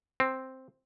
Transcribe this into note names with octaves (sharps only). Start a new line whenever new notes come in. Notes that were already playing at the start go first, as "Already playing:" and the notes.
C4